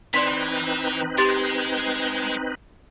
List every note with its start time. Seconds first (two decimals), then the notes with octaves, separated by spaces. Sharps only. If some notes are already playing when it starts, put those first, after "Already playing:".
0.14 E3 C4 D#4 B4 D5 C6 B6
1.18 G#3 G4 C6 A6